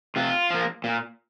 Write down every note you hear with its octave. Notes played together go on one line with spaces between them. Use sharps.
C3 F4
F3 A#3
A#2